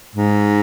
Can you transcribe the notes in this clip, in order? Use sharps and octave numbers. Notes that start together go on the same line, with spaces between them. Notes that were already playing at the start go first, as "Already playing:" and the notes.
G#2